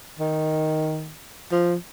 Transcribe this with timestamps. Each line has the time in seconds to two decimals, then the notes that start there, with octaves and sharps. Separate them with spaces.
0.19 D#3
1.52 F3